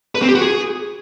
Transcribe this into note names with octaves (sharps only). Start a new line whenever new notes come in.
B4
C4
G4
F#4
G#4